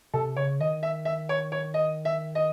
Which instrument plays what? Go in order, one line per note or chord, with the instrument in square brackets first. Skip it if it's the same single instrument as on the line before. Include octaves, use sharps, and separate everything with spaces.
[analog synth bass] C3 [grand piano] A4
[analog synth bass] C#3 [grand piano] C#5
[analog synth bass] D#3 [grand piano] D#5
[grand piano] E5
E5
C#5
C#5
D#5
E5
D#5